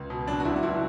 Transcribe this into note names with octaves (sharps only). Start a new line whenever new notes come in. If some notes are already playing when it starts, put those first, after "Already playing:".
Already playing: C#2
B2
F#3 D4
F#4
C#2 E4
F#4
C#2 E4